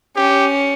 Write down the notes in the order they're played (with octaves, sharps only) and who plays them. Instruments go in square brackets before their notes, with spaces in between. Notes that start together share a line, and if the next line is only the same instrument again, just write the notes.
[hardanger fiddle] C#4 [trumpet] G4